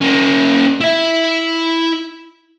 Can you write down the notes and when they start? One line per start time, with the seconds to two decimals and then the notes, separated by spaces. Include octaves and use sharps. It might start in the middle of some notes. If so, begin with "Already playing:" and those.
0.01 A#3 C#4
0.81 E4 E5